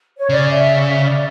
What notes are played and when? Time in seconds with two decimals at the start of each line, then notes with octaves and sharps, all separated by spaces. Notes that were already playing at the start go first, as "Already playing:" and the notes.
0.18 C#5
0.29 C#3 D5
0.49 E5
1.03 D5